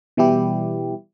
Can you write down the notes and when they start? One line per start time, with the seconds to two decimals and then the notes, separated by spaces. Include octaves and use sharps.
0.17 B2 E3 G3 E4 G4